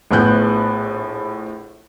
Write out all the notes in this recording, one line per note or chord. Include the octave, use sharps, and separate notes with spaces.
A#1 A2 B3 F#6 G6